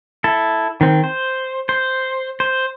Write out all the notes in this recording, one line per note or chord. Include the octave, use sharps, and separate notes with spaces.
E4 A4
D#3 C4
C5
C5
C5